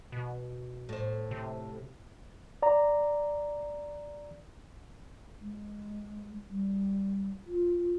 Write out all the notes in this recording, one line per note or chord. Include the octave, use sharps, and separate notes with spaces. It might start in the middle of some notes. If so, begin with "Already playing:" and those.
B2
A2 C5
C3
D5 A#5
G#3
G3
F4